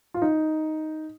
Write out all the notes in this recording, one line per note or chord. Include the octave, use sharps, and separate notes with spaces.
F4
D#4